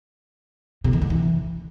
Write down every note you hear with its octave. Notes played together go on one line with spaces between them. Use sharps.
C3
D#3
D3
E3